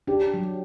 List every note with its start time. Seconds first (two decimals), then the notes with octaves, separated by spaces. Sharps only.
0.07 D4 G4
0.34 F#3